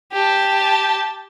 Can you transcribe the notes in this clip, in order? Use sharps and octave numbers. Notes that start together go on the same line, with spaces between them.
G4 A5